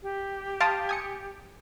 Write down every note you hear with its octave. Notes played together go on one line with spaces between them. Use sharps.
G4
F5 A5 C6 D#6 A6 D7
G#5 D#6 C#7